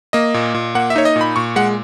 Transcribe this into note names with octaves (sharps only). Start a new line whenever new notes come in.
A#3 D#5
A#2
A#2
A#3 F#5
E5
D#4 C#5
D#5
A#2
B5
A#2 C#6
G#3 F#5